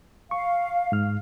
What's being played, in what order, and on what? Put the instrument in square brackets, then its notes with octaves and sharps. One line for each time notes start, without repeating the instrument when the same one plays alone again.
[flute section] F5 [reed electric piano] C#6
[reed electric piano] G#2 F6